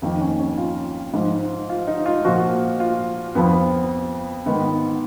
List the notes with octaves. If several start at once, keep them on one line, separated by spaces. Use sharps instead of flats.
F2 D#3 A#3
C#4
C#4
F4
G#2 F3
F4
D#4
F4
A#2 F3 F#4
F4
F2 F3 B3
G#2 D#3 B3